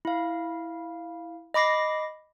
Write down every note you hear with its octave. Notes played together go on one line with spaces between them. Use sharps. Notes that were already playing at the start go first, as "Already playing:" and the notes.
E4 F5
D#5 B5 D6 A#6 C7